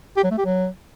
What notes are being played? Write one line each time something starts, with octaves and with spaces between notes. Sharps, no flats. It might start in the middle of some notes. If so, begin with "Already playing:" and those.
G4
F#3
A3
G4
F#3